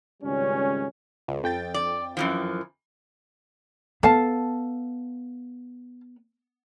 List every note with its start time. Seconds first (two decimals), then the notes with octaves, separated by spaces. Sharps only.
0.23 G#1 C#2 G3 C#4
1.28 C#2
1.43 F2 G5 A6
1.74 D5
2.17 F#2 E3 F3
4.03 B3 A4 F5 A5